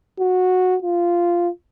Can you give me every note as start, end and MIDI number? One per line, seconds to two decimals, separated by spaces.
0.19 0.77 66
0.82 1.49 65